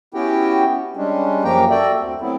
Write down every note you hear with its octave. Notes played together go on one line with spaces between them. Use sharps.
B3 C#4 E4 F#4 G4 G5
G3 G#3 C#4 D4
F#2 F3 A#3 G4 G5 A#5
F#4 A4 D5 E5 G5
D2 C4
F#3 A3 B3 C4 E4